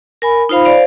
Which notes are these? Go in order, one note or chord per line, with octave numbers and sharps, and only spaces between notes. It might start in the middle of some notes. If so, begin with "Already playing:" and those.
A#4 G#5 B5
D#4 F4 C5 F5 B5
C5 D5 F5